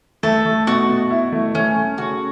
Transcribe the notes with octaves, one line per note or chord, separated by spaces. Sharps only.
A3 A4
A3
B2 F#4
B2
E4
A3
A3 C#4
A3
C#3 F#4